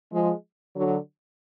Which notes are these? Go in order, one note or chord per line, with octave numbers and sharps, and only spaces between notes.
F3 G#3
D3 F#3